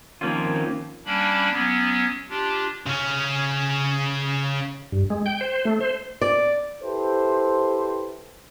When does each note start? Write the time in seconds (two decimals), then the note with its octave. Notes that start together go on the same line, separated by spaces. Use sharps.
0.21 D#3 F3 A#3 C4 C#4 F4
1.06 G3 A#3 C#4 D4 B5
1.52 F#3 B3 C#4
2.29 D4 F4 G4
2.87 C#3 C#4
4.92 G2
5.10 G#3
5.26 G5
5.41 C5
5.65 A3
5.80 C5
6.21 D5
6.83 E4 G4 A4 B4 C5